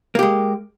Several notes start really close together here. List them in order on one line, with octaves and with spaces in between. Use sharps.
A#3 G4 G#3